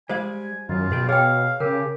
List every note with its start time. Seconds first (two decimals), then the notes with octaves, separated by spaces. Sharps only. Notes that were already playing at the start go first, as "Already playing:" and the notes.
0.09 G3 G#3 C5 F5 G#5
0.69 F#2 D#3 F4
0.91 B1 B2 G#4 G5
1.09 G#4 C#5 F5 G5
1.60 C#3 G4 A#4